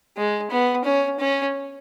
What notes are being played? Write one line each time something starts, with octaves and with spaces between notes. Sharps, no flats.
G#3
B3
C#4
C#4